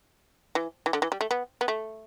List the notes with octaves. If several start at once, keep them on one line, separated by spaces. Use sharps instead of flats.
E3
E3
D3
E3
G3
A3
B3
B3
A3